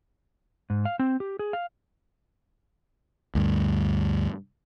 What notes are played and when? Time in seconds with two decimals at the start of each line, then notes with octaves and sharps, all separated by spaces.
0.70 G#2
0.85 F5
0.99 C4
1.20 G4
1.39 G#4
1.53 F5
3.35 D2 G2